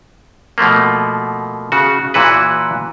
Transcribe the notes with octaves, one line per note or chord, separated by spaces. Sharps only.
B2 F3 A3 A#3
C#3 F#4
A#2 E3 F#4 B4